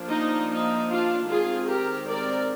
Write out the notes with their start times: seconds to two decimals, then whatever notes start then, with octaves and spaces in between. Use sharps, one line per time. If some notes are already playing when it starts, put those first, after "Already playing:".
Already playing: F3 A#3 D4
0.09 D#4
0.49 D#4
0.89 D4 F4
1.28 D#3 G#3 C4 F4 G#4
1.68 G4 A#4
2.08 A#4 D5